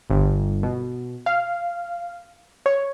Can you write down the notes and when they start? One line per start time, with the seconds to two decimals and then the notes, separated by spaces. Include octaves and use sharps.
0.10 G1
0.63 B2
1.26 F5
2.66 C#5